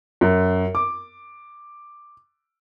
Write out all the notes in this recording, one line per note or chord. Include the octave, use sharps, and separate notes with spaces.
F#2
D6